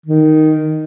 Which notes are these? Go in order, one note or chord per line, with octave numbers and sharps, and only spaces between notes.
D#3